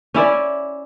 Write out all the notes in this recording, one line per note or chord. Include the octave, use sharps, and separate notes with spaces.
C#4 E4 D5